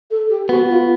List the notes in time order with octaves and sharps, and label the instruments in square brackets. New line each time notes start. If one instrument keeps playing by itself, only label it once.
[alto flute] A4
G4
[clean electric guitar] B3 [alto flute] F#4
[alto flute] F4